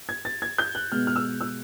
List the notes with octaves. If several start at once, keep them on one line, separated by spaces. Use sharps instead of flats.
G#6
A6
G#6
G6
F#6
B2 G#3 B3 F6
F6
E6
E6